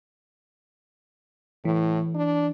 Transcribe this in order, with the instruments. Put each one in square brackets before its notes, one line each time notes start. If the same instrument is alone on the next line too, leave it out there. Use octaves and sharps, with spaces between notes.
[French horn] A2 [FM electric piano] E3
[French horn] D4